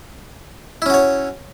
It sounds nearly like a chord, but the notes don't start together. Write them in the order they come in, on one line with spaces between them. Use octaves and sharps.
E4 C#4 F#4 C#5